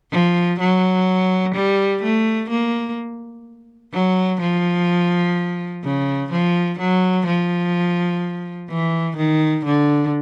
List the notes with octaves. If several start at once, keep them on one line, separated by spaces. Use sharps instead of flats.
F3
F#3
G3
A3
A#3
F#3
F3
C#3
F3
F#3
F3
E3
D#3
D3